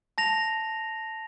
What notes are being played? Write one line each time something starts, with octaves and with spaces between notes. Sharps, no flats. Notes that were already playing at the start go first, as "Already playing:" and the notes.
A5 A#6 F7